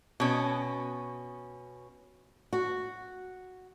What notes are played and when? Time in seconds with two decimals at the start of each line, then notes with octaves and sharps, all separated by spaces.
0.20 B2 C#4
2.53 F#4